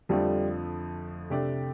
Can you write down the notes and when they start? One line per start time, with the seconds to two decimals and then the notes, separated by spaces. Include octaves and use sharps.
0.09 F2 D3 F3 G3 A3
1.30 C3 A3 D4 G4 D5